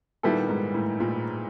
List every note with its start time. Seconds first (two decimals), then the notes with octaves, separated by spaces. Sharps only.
0.23 A#2 D#3 G3 B3 E4 A4
0.48 G#2
0.74 A2
1.00 A#2